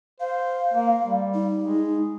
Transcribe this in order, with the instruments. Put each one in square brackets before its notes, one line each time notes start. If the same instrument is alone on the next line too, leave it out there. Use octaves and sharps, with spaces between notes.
[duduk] C5 [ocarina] F5
[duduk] A#3
G3
[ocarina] D#4
[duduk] G#3